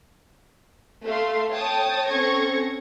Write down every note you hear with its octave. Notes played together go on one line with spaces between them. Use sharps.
A3 F5 C6
C#5 G5 A5 D#6
C4 C#4 A4 C#6 G#6 A#6